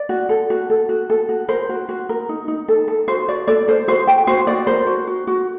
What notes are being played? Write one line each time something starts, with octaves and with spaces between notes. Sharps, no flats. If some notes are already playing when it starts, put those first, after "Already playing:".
Already playing: D5
F#4
A4
F#4
A4
F#4
A4
F#4
A#4 C5
F#4
F#4
A#4
D#4
D#4
A4
A4
F#4 C5
F#4 D5
A4 D5
A4 C5
F#4 C5
F#4 G5
F#4 C5
F#4 D5
A#4 C5
F#4
F#4
F#4